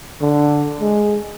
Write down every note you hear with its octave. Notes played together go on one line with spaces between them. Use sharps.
D3
G#3